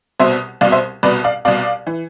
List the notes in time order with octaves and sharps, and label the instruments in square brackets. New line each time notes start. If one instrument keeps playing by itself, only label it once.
[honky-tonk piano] C2 B2 C5 E5
C2 D5 F5
B2
C5 E5
C2 B2 B4 D5
D5 F5
C2 B2 D5 F5
E3